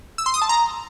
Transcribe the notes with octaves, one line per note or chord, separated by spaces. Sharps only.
E6
C6
D#6
A5
A#5